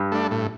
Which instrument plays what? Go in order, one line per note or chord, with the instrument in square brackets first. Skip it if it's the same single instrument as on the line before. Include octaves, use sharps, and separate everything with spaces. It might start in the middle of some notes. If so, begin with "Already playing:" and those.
Already playing: [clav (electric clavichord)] G2
[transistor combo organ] A3 D4
A2